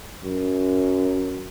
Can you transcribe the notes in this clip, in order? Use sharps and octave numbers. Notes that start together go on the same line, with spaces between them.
F#2